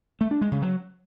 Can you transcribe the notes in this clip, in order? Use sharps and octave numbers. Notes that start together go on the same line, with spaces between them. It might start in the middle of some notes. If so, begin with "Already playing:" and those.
A3
D4
G#3
C#3
F#3